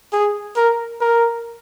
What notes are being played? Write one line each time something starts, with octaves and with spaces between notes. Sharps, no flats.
G#4
A#4
A#4